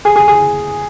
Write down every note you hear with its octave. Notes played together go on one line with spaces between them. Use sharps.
G#4
G#4
G#4